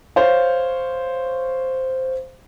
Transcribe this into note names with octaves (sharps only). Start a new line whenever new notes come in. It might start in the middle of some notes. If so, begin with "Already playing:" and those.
C5 C#5 F5